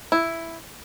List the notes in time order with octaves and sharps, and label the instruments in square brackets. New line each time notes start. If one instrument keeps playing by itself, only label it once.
[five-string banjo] E4